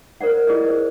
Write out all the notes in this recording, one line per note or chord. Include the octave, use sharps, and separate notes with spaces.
A#4 C5 D5 F#5
E4 G#4 D5 D#5
C5